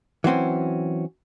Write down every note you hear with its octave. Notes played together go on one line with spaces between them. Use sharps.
E3 F#3 C4 C#4